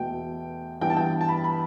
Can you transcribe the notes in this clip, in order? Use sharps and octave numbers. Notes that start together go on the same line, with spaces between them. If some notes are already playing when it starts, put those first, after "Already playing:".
Already playing: E2 B2 A3 G5
G2 E3 B3 G5
A5
G5
A5
B5
B5